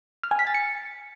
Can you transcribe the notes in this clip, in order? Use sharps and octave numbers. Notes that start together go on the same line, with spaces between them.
F6
G#5
B6
A6
C#7